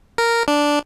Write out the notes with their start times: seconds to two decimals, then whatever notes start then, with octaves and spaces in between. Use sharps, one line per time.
0.18 A#4
0.48 D4